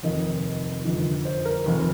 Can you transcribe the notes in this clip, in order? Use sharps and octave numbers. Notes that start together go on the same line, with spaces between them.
F1 D#2 D#3 D#5
G1 F2 D#3
C5
A#4
F1 D#2 D#3